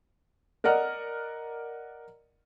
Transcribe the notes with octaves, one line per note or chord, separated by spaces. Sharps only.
A#4 D5 D#5 F#5 F6